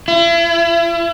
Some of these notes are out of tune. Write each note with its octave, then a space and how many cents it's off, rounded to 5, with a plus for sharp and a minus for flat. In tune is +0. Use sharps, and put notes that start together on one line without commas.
E4 +40